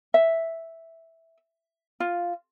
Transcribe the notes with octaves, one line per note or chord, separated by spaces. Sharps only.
E5
F4